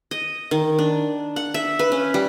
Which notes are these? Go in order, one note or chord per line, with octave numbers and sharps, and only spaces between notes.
D#5
D#3
D4
F#5
E5
B4
C#4
G3